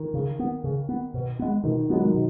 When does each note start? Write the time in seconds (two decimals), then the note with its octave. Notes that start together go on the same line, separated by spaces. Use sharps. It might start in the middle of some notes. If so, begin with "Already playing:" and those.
Already playing: D#3
0.14 C#3
0.39 B3
0.64 C#3
0.89 B3
1.14 B2
1.39 G#3 B3
1.64 B2 D#3
1.90 F#3 G#3 B3
2.02 D#3
2.14 B2